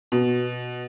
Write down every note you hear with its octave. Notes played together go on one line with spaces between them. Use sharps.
B2